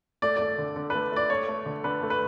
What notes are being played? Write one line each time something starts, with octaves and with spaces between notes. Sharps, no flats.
A3 D5
A3 D5
D3
D3
B4
A3
A3 D5
A3 C#5
A3
D3
D3 B4
A3
B4